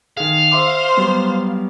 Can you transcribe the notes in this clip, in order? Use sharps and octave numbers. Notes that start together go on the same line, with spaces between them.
D#3 G#4 F5
C5 E5 C6 D6
F#3 G3 B3